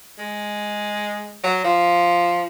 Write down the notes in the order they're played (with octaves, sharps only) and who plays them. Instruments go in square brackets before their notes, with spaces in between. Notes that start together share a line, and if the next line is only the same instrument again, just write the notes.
[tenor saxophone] G#3
F#3
F3